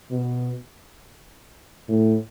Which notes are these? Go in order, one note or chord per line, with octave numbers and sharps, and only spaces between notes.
B2
A2